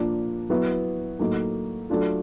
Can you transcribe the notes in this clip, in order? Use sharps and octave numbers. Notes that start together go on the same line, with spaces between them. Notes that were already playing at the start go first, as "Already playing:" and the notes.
Already playing: A#2 F3 A#3 D4
F#3 B3 E4
A2 F#3 A#3 D#4
F#3 A3 D4 F4